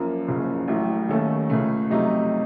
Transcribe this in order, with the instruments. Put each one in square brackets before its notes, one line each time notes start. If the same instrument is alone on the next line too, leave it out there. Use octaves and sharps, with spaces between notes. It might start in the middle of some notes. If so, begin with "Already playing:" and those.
Already playing: [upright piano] F#2 F3 A#3
F#1 F#2 C#3 F3
A1 A2 F#3 A3
D#2 D#3 A3 C#4 A4
C#2 C#3 A3
F2 C3 F#3 A3 D#4